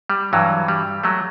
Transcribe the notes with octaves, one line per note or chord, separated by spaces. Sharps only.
G3
G2 E3 F#3
G3
F#3 A3